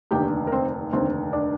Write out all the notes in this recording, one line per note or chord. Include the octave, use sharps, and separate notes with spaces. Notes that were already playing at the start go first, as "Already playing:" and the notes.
F1 D#2 D3 G4 G5
A#4
C4 C5
F1 D#2 D3 C4 C5
D4 D5